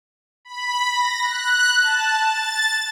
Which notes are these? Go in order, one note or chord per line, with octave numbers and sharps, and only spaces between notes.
B5
A#6
F#6
A5
A6